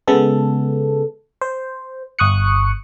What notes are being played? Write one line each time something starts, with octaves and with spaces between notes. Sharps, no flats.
C#3 G#3 B3 A4
C5
G1 C#6 D#6 F#6 C#7